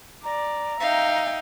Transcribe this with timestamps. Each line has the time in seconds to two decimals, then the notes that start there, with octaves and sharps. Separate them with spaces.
0.24 D5 A#5
0.80 D#4 E5 F5 G5